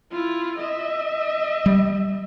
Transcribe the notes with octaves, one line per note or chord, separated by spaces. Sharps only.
E4 F4
D#5 E5
G3